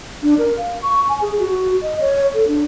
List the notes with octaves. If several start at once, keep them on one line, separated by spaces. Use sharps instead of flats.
D4
A#4
F5
C#6
G#5
G#4
F#4
D#5
C#5
A4
D4